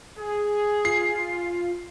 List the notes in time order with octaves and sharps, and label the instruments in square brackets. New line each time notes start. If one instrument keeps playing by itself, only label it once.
[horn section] G#4
[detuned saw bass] F4 [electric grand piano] C7